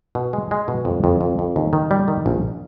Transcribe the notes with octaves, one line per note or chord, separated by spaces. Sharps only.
B2
G#3
G#3
B2
F2
F2
F2
F2
D#2
D#3
G3
D#3
A#1